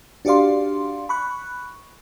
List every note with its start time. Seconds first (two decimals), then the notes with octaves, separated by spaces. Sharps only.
0.25 D4 F#4 G4 D5 F5 C6
1.09 B5 C#6 F#6